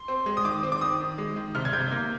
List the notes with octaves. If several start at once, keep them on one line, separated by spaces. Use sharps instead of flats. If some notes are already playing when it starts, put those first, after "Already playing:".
Already playing: C6
C4
G#3
D#6
D#3 D6
C4
D6
D#3 D#6
D#3
G#3
D#3
C3 F6
G#6
C3 G6
A#3